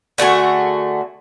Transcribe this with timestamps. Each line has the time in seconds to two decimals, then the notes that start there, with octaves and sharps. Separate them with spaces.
0.18 D3 A3 F#4 G#4